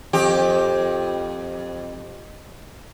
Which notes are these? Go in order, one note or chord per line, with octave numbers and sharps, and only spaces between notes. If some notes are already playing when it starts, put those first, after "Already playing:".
F2 G4